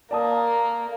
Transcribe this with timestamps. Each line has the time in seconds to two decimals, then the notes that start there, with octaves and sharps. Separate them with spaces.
0.11 A#3 D5 A5 D#6